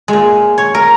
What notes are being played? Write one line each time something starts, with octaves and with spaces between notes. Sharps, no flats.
G#3
A#2
C#5
A#4